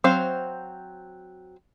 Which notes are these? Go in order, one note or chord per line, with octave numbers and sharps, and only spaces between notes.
F#3 C4 C5 F5